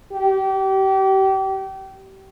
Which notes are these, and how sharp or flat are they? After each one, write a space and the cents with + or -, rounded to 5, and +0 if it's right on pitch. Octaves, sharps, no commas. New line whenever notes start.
G4 -30